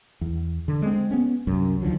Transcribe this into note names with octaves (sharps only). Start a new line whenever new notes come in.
E2
D3
G#3 C4
B3 C#4
C2 F#2
D#2 D3 F3 F#3